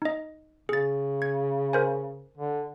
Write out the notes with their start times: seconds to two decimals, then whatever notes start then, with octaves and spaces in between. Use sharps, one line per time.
0.02 D#4 D#5
0.69 C#3 G#4 A6
1.22 G#6
1.73 A#4 C5 G#5
2.37 D3